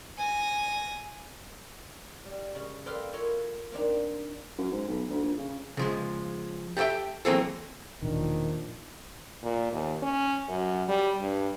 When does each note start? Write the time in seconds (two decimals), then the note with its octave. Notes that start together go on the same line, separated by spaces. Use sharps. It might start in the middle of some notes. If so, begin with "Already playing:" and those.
0.18 G#5 A#6
2.25 G3
2.55 C#3 G#3
2.86 A4 B4 C5 D5 F5 G5
3.13 E4 F4 A4 A#4 C#5 D#5
3.72 A#3 C4 D4 D#4
4.58 F#2
4.72 G#2
4.88 B1
5.10 D2
5.23 A#1
5.38 C#3
5.77 C#3 F3 G#3
6.77 G4 A4 C#5 E5 G5
7.25 E3 F#3 A#3 C4 G#4 A4
8.02 E1 A#2 D#3 F3 D4
9.43 A#2
9.73 D#2
10.02 C#4
10.49 F#2
10.88 G3
11.21 G2